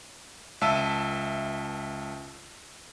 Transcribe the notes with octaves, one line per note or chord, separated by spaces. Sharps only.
C#2 E5 A5 E6 D#7